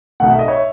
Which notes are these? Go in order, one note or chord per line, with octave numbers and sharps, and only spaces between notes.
B1 B2 A3 F#5
E5
D#5
C#5 E5